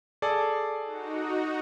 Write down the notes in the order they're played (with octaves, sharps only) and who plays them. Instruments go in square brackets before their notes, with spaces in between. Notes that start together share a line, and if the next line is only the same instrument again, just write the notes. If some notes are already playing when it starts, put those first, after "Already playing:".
[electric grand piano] G#4 A4 D5
[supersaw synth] D#4 F#4